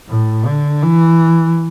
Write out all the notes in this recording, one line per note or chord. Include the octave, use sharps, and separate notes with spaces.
A2
D3
E3